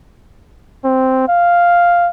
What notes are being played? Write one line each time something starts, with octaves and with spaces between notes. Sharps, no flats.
C4
F5